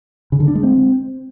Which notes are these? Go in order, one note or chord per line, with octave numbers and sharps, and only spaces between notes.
C#3
D3
D4
G#3
C4